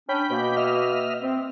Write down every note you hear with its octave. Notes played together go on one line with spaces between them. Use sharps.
C#4 D4 G5 B5
B2 A#3
D#5 E5 F6
C4